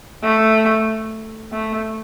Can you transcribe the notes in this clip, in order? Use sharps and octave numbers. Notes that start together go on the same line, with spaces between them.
A3
A3